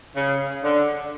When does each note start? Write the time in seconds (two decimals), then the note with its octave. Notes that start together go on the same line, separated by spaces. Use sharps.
0.16 C#3
0.63 D3